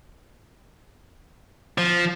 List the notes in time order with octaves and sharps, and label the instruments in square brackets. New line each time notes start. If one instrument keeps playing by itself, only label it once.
[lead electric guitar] F3